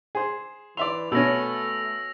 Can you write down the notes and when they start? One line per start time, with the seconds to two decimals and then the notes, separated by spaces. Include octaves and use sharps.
0.15 G#4 C5
0.77 E3 D5 E5 C6 F7
1.12 B2 A3 C#4 E6 A#6